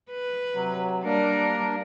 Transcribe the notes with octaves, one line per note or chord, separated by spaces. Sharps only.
B4
C3 F#3
G3 A#3 D4 A#4